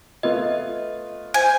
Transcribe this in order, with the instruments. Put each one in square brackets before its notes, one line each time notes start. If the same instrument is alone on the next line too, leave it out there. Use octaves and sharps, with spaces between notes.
[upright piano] A3 B3 F4 [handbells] D#5
[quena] C5 [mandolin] G#5